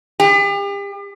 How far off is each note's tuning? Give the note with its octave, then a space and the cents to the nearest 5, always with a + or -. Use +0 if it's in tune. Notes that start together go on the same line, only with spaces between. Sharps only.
G4 +40